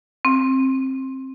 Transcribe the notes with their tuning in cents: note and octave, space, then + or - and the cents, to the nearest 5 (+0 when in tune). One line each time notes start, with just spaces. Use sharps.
C4 +20